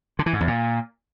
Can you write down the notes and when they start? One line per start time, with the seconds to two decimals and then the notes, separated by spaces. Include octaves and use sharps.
0.19 D3
0.26 E3
0.33 G#2
0.40 E2
0.48 A#2